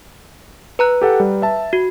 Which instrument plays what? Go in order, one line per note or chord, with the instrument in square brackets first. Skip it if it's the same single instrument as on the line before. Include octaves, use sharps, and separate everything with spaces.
[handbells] B4 A#5 F#6
[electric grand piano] G4 A4 F#5
G3
E5 A5
[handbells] F#4